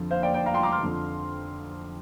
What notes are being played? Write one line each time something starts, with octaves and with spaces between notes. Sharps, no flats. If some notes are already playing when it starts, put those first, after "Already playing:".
Already playing: F2 D3 F3
C5 F5
D5 G5
D5 G5
F5 A#5
G5 C6
A#5 D6
C6 F6
F2 D3 F3